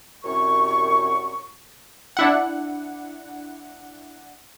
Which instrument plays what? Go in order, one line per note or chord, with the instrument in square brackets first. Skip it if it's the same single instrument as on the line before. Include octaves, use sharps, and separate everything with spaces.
[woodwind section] C2 F#2 C#6
[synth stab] D4 E4 F#5